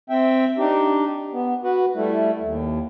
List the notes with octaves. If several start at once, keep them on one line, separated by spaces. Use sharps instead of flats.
C4 E5 G5
D4 D#4 G4
B3
F#4 B4 F#5
G3 A3 E4
D#2